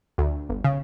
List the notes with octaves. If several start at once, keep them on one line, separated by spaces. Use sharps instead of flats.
D2
G1
C#3